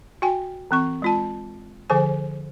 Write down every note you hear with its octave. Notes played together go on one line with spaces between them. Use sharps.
F#4 G5 G#5
E3 C4 C#6
G#3 F4 A5
D3 F3 A4 C5 G#5